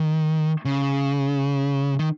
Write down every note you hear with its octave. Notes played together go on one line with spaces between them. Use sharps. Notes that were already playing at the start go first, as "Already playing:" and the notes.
Already playing: D#3
C#3
D#3